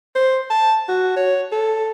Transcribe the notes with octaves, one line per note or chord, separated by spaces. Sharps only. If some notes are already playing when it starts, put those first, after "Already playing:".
C5
A5
F#4
C#5
A4